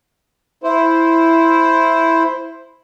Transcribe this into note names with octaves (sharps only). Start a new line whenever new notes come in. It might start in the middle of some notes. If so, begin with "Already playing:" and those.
E4 C5